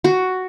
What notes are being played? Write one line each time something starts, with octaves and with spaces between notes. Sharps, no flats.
F#4